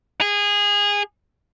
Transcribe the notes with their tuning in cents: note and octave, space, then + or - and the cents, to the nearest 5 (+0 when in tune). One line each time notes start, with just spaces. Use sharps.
G#4 -20